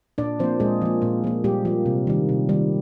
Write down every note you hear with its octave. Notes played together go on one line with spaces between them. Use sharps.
A#2 D4 D5
F3 A#3 C4 C5
A#2 G#3 G#4
F3 A#3
A#2
F3 A#3
A#2 G3 G4
F3 A#3
C3
D#3 G3
C3
D#3 G3